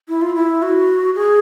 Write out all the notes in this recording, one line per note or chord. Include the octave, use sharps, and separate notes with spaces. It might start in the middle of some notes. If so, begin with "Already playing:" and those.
E4
F4
E4
F#4
G#4